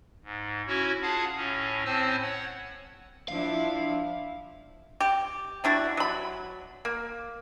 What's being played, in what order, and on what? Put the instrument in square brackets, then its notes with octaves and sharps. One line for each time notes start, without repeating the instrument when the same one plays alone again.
[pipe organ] G#2
C#4 E4 F#4 C#5
F4 G#4 F5 F#5 A5
A2 C#4
A2 C4 C5 G#5 A5 E6
C#5 F#5
[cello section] F3 D4 E4 [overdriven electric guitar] F5
[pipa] G4
G3 D4 E4 F#4
F#3 B5
A#3